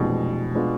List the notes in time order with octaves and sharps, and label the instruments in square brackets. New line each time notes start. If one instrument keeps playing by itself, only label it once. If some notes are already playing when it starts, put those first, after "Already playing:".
Already playing: [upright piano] F1 F2 E3 G#3 D4 [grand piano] B2
[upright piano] G#3 B3 D4 F4